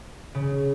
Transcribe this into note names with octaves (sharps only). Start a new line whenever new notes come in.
C#3